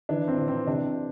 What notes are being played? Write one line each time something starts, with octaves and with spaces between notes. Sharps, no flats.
E3 D4
C4
E3
C4
C3 D4